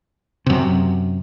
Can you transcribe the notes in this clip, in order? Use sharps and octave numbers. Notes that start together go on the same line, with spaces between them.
F#2 C3